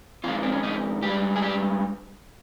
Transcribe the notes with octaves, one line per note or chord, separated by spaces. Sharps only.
F2 D#3 G#3 F4
C4
C#4
D#4
G#2 G3 G4
G#4
G4